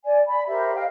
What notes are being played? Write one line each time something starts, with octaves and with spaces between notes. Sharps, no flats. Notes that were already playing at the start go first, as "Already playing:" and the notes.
D5 G#5
B5
G4 A#4 C5 E5
D#5 F5 G5